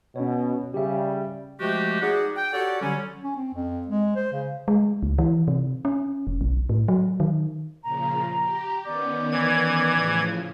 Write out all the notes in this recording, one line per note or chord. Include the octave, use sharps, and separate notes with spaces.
B2 C#4 C#5
C#3 G3 G4 E5
F3 G#3 A3 F#4 G4
D#4 F#4 G#4 D5 F#5
G5
F#4 G4 A4 C#5 D5 F#5
D3 F#3 G3 C#4
C#4
C4
F2
G#3
C5
C#3
G#3
C#2
E3
C3
C#4
F1
B1
A2
F#3
D#3
A#2 C#3 F3 A#5
G4
D#3 B3 C#4 D5 D6 G6
E3 G#6
A2 C#3 F3